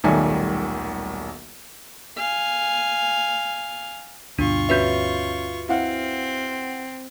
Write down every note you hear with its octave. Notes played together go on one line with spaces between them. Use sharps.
D#1 B1 D#3 G3 A3 G#5
F5 G#5
D2 G2 B2 D4 F4 C#6
C#4 F#4 B4 E5 G6
C4 E4 F5 F#5